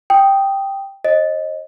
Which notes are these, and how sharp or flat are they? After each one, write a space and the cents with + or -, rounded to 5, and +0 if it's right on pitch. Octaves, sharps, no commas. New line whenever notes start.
G5 +0 D#6 +0
C5 +45 D#5 +0